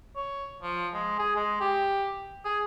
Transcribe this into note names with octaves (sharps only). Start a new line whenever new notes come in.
C#5
F3
G#3
G#4
G#3
G4
G#4